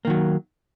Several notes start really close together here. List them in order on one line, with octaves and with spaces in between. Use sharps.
A#3 D#3 F#3